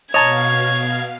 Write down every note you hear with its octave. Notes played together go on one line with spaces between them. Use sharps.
B2 C#5 D#5 F5 A5 A#5 G#6